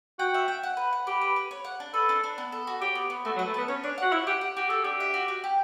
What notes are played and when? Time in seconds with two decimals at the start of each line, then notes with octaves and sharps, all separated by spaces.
0.19 F#4 G5
0.34 E5
0.48 G5
0.63 F#5
0.77 B4
0.93 F#5
1.07 G4 B4
1.21 B4
1.36 B4
1.51 C#5
1.65 F#5
1.80 D4
1.94 A4 B4
2.09 D4
2.24 D4
2.38 B3
2.52 A4
2.67 F#4
2.81 G4 C#5
2.95 B3
3.10 B3
3.25 A3 F#4
3.36 F#3
3.39 B4
3.47 A3
3.54 B3 A5
3.68 C#4 C#5
3.84 D4 C#5
3.98 F#4 F#5
4.12 E4 F#5
4.27 G4 F#5
4.41 F#5
4.57 F#4 G4
4.69 F#4 A4
4.83 D4 G4
5.00 E5
5.14 F#4
5.28 F#4
5.44 G4